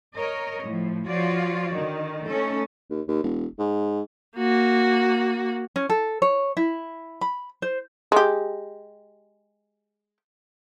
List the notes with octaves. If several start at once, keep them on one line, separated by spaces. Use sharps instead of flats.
A#4 C#5 D#5
A2 F3
F3 F4 F#4 C#5 D5
D3 D#3
A3 C#4 D#4 A4
D#2
D#2
E1
G#2
A#3 F#4
C#4
A4
C#5
E4
B5
C5
G#3 G4